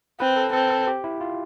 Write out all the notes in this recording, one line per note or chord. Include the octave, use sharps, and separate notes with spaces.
C4 B4
A4
C4 A4
A4
G4
E4
F4